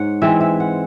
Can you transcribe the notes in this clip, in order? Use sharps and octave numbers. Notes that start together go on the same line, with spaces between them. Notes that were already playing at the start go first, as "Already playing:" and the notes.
Already playing: G#2 C#5 F#5
E3 G#3 C4 E5
E5
F#5